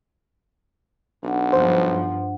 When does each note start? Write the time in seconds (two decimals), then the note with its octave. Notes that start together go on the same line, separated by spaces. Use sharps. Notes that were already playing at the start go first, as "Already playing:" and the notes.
1.23 B1 D4 F#5
1.53 G2 F3 C5